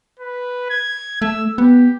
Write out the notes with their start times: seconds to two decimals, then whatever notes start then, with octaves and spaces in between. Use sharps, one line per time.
0.20 B4
0.70 G#6
1.22 A3 E6
1.58 B3 G4